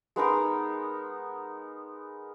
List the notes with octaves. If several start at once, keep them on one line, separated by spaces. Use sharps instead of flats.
G#3 B3 D#4 A#4